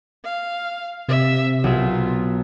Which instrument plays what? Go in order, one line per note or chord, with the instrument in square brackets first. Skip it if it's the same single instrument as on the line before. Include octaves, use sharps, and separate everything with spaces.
[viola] F5
[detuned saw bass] C3 [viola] E5
[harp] B1 [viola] F4 A#4